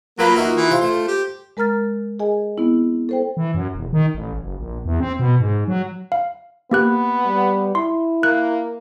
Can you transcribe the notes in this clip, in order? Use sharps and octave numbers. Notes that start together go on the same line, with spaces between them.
F#3 A#3 F4 B4 B5
D#4 F4 F#4 E5
E3
C3 C5 F5
A3 C5
G4
G#3 A#4 A#5 F6 A6
G#4 D#5 G#5
B3 C4 E4
A4 C5 G5
E3
F#2
E1
D#3
A1
F#1
A#1
E2
C4
B2
G#2
F#3
F5
A#3 B3 G4 F#6
G3
E4 C6
A#3 F#6